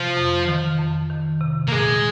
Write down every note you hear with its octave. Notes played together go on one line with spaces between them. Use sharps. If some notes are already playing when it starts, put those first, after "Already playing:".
Already playing: C3 F3
F2
D#3
F2
D#3
C3
A#3
A#2 G#3